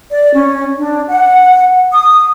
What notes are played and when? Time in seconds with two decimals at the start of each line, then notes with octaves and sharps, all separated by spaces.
0.11 D5
0.34 C#4
0.78 D4
1.07 F#5
1.92 D#6